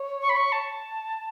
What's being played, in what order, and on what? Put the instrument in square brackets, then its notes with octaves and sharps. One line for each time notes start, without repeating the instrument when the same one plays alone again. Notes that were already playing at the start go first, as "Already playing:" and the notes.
Already playing: [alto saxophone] C#5
[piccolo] C#6
B5
C#6
A5